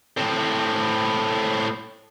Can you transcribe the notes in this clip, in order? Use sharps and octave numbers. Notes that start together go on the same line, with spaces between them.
A2 C4